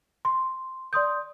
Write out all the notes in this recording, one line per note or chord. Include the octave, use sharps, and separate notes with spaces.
C6
D5 C6 D#6 G6